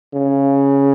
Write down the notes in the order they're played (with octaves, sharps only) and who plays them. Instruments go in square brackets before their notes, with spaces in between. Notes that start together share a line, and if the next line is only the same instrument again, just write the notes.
[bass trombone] C#3